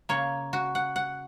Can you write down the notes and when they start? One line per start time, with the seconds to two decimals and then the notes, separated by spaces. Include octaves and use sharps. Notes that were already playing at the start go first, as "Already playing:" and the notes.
0.09 C#3 A#3 C#5
0.53 F#4
0.75 F#5
0.96 F#5